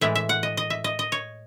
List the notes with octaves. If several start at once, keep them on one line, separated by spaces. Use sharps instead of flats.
A2 E3 G#3 E5
E5
F#5
D#5
D#5
E5
D#5
D#5
C#5